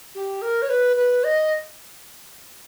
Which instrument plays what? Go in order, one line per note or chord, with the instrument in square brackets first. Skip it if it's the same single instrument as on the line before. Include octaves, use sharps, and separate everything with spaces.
[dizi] G4
A#4
C#5
B4
B4
D#5